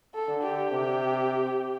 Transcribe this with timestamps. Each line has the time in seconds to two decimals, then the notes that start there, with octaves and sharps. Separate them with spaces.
0.14 A4
0.28 D3
0.43 G4
0.71 C3